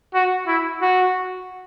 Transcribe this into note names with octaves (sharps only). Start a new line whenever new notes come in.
F#4
E4
F#4